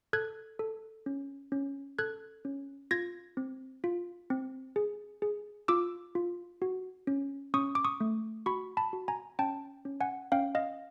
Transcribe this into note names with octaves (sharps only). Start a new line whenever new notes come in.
A4 F#6 G#6
A4
C#4
C#4
A4 F#6 G#6
C#4
F4 G#6 A#6
C4
F4
C4
G#4
G#4
F4 D6 E6
F4
F#4
C#4
C#4 C#6 D#6
D6
C#6 D#6
A3
F#4 B5 C#6
A5 B5
F#4
G#5 A#5
C#4 G5 A5
C#4
F#5 G#5
C#4 F5 G5
D#5 F5